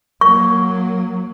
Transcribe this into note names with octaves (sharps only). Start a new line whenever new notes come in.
F#3 A#3 C#6